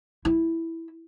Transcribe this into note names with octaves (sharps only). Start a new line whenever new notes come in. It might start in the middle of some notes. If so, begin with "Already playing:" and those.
E4